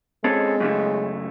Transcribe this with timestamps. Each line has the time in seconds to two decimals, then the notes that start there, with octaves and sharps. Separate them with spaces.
0.24 G#3 C4 C#4 A4
0.60 F#2 C#3 A3